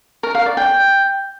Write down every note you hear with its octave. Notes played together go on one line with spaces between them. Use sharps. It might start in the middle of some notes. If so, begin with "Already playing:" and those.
A#4
F5
D5
G5